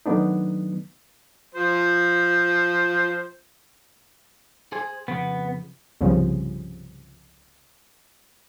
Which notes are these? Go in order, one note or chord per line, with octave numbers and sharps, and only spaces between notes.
D#3 F#3 A3 B3 D4 D#4
F3 C5
G#4 C5 G#5
F2 C#3 B3
C2 G2 C#3 F3